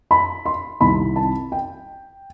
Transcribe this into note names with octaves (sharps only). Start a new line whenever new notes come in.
B5
C6
C2 C3 D#3 B5
A5
G5